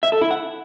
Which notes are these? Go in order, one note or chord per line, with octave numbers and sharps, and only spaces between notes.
E5
A4
E4
F#5